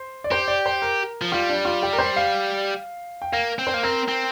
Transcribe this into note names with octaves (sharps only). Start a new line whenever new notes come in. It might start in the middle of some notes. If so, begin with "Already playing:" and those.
Already playing: C5
D5
G4 C5
D5
C5
A#4
F3
G3 F4
D4
F4
G4
A#4
C5
F5
G5
A#3 F5
C4
C5
A#3
C4 A#4
C4